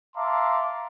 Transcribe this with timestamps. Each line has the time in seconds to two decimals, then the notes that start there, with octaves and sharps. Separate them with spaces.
0.16 E5 F5 A5 A#5 C6 D6